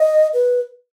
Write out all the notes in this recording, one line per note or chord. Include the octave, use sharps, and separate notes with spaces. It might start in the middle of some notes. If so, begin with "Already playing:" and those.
Already playing: D#5
B4